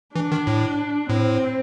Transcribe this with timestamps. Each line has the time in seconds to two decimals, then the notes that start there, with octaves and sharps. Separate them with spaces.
0.16 E3 D4
0.32 D#3
0.47 A2
1.09 A2 C4